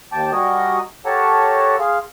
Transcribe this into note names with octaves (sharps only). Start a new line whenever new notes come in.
D#2 G5 A5 D6
G3 F#4 A#4 D#5 G#5 D#6
G4 A4 A#4 C#5 F#5 A5
G#4 F5 C6